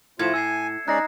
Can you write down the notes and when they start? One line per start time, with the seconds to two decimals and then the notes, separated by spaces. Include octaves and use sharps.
0.19 A2 F3 A3 F4 G#6 C#7 E7
0.34 G#5 E6 G#6 C7
0.88 G#3 C#4 D#4 D5 F#6 A#6 C7